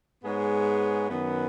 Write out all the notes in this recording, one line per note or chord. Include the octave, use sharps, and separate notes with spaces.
G#2 G#3 B3 G#4 C#5
F#2 D#3 B3